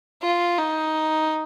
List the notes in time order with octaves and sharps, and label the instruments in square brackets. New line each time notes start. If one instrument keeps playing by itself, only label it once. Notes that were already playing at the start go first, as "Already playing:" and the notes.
[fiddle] F4
D#4